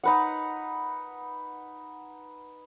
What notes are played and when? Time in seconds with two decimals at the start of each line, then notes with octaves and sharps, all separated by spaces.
0.04 D#4 B4 F#5